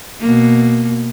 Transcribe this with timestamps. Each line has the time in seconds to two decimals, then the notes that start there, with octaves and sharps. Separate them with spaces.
0.20 B2 A#3